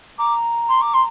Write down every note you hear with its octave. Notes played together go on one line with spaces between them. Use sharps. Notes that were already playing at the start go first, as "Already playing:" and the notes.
A#5 D6
C6
D6
C6